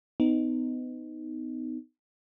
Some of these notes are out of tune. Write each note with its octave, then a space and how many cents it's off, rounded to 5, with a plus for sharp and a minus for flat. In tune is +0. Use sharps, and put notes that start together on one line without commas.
B3 +35 D#4 +0